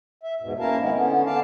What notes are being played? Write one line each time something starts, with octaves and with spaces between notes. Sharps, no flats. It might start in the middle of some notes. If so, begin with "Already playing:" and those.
E5
E2 G#2 B2
A#3 C#4 E4 A#4 F5 A5
D#3 G#3 B3 C4 D#4 E4
D3 B3 C#4
D3 D5 F5 A5